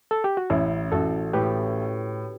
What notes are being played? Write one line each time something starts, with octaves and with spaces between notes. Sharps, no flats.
A4
G4
F#4
A1 C#4 E4
A1 F#4 A4
A2 G4 B4